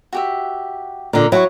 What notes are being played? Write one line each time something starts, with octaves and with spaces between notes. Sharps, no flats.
F#4 G4 E5
A#2 D3 A#4
F#3 E4 F#4 C#6